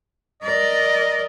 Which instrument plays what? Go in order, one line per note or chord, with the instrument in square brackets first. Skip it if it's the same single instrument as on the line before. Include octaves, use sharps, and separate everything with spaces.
[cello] A#4 D5 [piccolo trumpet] D#5